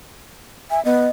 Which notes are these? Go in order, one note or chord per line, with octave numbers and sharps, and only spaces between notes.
E5 G#5
B3 D#5